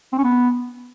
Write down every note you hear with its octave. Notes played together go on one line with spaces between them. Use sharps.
C4
C#4
B3